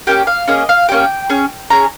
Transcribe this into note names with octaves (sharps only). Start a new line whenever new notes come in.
A#3 C#4 G4 G5
F5
A#3 C#4 G#4 D#5
F5
A#3 C#4 G4 G5
C#4 G#4
C#4 G#4 A#5